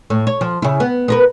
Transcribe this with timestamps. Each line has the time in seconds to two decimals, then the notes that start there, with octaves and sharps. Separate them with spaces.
0.10 A2
0.27 C#5
0.41 F3
0.62 C#3 E4
0.80 B3
1.08 B3 A#4 B4